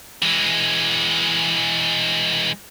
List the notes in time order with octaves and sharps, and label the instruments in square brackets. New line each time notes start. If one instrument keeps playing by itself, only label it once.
[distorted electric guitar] E3 G#3